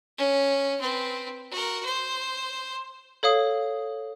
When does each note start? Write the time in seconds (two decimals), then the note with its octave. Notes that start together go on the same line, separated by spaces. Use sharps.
0.18 C#4
0.81 C4 B4
1.51 F#4 A#4
1.85 C5
3.23 A4 C#5 F5 D#6